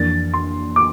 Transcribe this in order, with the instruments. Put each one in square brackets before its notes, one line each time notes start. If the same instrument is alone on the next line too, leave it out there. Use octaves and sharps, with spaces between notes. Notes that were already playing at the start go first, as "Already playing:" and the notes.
Already playing: [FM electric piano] F2 E3 A#3 D4 [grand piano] A6
[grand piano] C6
D6